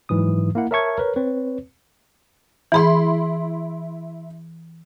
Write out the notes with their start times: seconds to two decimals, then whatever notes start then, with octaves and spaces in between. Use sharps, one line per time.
0.09 G#2 E3 F#3 D#6
0.55 A#3 E4 F#5
0.71 A#4 C#5 E5 A5 C#6 G#6
0.98 A#4 B4 C#5
1.16 C4 B4 C#5
2.72 E3 E4 G#4 B5 C6